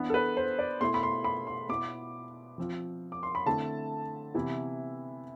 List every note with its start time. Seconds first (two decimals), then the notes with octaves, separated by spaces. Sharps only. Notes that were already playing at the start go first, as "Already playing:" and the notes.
Already playing: E3 B3 D4
0.10 A4
0.14 B4
0.37 C5
0.59 D5
0.81 B2 A3 E4 C6
0.94 B5
1.03 C6
1.24 B5
1.47 C6
1.69 B2 B3 E4 D6
2.58 F3 C4 F4
3.12 D6
3.23 C6
3.35 B5
3.46 D3 A3 C4 E4 A5
4.35 C3 E3 B3 E4